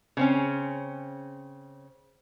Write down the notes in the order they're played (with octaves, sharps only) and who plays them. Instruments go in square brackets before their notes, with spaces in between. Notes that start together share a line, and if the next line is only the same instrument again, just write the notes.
[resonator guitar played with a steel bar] C#3 C4 C#4